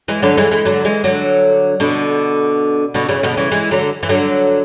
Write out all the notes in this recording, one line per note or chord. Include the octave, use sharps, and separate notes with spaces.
E3 G#3
D3 F#3
E3 G#3
E3 G#3
D3 F#3
E3 G#3
D3 F#3
B2 D3
B2 D3
C#3 E3
B2 D3
C#3 E3
E3 G#3
D3 F#3
E3
D3 F#3